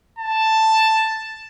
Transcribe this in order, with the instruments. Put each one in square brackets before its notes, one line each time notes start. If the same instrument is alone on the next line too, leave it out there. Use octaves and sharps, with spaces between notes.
[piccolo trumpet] A5